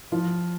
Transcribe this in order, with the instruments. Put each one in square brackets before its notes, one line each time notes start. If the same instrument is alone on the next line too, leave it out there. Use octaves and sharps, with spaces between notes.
[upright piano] F3 F4